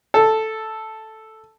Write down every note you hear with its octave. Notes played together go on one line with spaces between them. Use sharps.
A4